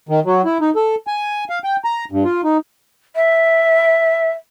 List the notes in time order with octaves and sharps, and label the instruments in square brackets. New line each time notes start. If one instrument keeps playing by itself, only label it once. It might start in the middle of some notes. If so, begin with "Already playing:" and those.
[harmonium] D#3
F#3
E4
D#4
A4
G#5
F5
G5
A#5
G2
F4
D#4
[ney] E5